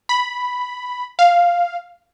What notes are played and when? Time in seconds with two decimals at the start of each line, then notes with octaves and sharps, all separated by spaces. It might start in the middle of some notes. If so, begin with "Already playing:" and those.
0.09 B5
1.19 F5